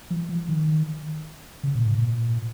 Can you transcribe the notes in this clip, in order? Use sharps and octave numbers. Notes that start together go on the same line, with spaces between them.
F3
F3
D#3
C#3
A#2
G#2
A#2